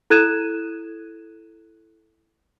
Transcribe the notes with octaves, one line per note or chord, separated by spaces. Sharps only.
E4 A4 F#6 G#6 D#7 E7